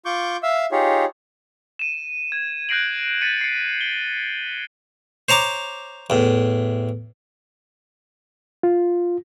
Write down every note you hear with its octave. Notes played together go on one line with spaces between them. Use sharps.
F4 C#6 D6 G6
E5 F5 E6
D#4 F4 G4 G#4 C#5
D#7 E7
G#6
F#6 G6 A#6 C7 D7 F#7
A6 B6 C#7 D#7
C7 C#7
G7
C5 C#5 A#5 D6
E2 A2
F4